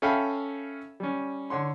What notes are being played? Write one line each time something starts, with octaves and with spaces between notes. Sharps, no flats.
C#4 A4 E5 F5 G5 B5
G3 C#4
D3 C#5 C6